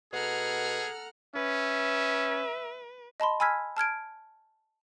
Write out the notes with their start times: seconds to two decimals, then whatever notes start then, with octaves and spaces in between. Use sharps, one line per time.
0.13 B2 G#4 A4 F#5 A#5 F6
1.36 C#4 B4 E5
3.20 D#5 A5 B5 C6
3.40 G#5 B5 E6 F6 G#6 B6
3.77 A5 F6 G#6 D7